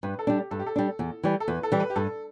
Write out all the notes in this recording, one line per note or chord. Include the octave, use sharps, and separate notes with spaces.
G2 B4
A4
G3 D4
G4
G2 A4
G4
A4
G3 D4
E2
E3 G3
A4
E2 B4
A4
E3 G3
B4
G4
G2 A4